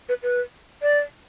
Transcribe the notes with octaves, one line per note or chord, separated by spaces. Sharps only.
B4
B4
D5